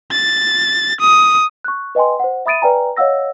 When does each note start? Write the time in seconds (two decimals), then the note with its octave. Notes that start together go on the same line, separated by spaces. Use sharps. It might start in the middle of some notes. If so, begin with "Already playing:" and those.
0.12 A6
1.00 D#6
1.64 C#6 F#6
1.95 B4 D#5 G5 G#5 C6
2.20 C5 F#5
2.46 E5 B5 D#6 A6 D7 D#7
2.62 B4 D5 G5 G#5 A#5
2.97 C#5 D#5 F5 F#5 E6 A#6